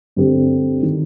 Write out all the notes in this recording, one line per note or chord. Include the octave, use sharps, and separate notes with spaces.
G2 D3 G3 C4 G4
D#3